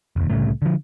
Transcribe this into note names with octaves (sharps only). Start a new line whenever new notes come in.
F1 D#2
C2 A2 C#3 A3
D3 F3